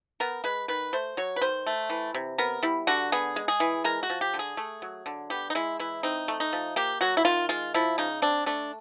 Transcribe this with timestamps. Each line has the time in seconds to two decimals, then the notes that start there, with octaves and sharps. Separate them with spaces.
0.20 B3 A#4
0.44 G#3 B4
0.68 D#3 B4
0.93 A3 C5
1.17 F#3 C#5
1.36 B4
1.41 D#3 C5
1.67 A3
1.90 E3
2.14 C3
2.38 B3 A#4
2.63 G3 E4
2.87 D3 F#4
3.12 B3 G#4
3.36 G#3
3.48 G#4
3.60 E3
3.84 G#3 A#4
4.03 F#4
4.10 F3
4.21 G4
4.34 D3
4.39 G#4
4.57 A3
4.82 F#3
5.06 D3
5.30 B3 G4
5.50 D#4
5.55 G#3 E4
5.79 E3 E4
6.03 C4 D#4
6.28 A3
6.40 D#4
6.53 F3
6.76 A#3 G4
7.01 F#3 F#4
7.17 E4
7.25 D#3 F4
7.49 G#3 F4
7.74 F3 E4
7.98 C#3 D#4
8.22 C4 D4
8.46 A3 D4